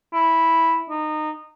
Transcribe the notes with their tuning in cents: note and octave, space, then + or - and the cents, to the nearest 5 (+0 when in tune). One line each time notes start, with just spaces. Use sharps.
E4 -5
D#4 -20